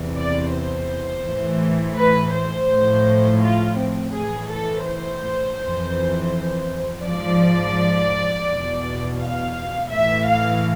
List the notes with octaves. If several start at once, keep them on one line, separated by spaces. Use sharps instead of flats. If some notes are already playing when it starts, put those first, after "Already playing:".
Already playing: E2 C3 E3
D5
C5
A2 E3
B4
C5
A2 F3
F4
C4
A2 E3 G#4
A4
C5
F2 E3
G#2 F3 D5
E2 B2
F5
A2 E3 E5
F5